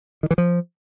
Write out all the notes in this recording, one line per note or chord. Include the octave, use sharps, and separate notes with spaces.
D#3
E3
F3